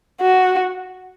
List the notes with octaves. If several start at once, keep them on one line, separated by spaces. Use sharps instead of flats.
F#4